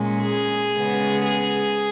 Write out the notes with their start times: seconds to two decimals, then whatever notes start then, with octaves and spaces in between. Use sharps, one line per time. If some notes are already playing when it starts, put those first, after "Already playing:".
Already playing: A#2 G#3 C#4
0.22 G#4
0.74 C#3 G#3 B3
1.25 G#4